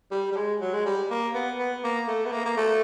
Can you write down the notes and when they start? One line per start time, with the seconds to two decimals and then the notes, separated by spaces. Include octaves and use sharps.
0.11 G3
0.31 G3
0.37 G#3
0.61 F#3
0.74 G#3
0.86 G3
1.10 A#3
1.34 B3
1.59 B3
1.84 A#3
2.08 A3
2.25 B3
2.32 A#3
2.45 A#3
2.57 A3